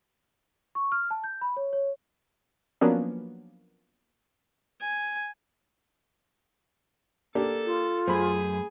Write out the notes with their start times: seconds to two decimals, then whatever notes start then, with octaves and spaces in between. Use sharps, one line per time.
0.75 C#6
0.92 F6
1.11 A5
1.24 G6
1.41 B5
1.57 C#5
1.73 C#5
2.81 F3 F#3 A#3 B3 C#4 D4
4.80 G#5
7.35 A#3 D4 G4 A4
7.66 F4
8.07 F#2 A3 G#4 C5 G#5 B5